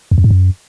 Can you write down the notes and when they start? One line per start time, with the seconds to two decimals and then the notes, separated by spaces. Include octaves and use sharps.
0.11 E2
0.18 F2
0.24 G#2
0.31 F#2